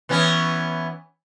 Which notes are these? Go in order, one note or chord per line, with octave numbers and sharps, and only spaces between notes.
E3 B3 C#4